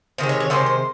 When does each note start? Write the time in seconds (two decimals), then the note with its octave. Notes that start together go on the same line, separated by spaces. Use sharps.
0.18 C3 D#3 G#3 C5
0.29 C#5
0.40 C#5
0.50 C3 D#3 G#3 C5
0.66 C5